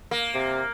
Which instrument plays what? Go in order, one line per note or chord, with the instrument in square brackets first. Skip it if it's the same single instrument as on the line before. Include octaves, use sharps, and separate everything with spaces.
[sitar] A#3
[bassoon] C3